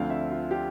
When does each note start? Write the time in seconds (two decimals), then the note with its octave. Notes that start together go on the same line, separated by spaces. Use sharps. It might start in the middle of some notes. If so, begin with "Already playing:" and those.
Already playing: D2 D3 F3 C4 F5
0.10 E5
0.31 F4
0.51 G4